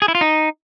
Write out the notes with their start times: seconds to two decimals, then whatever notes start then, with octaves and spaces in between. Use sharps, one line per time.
0.02 G#4
0.08 E4
0.15 F4
0.21 D#4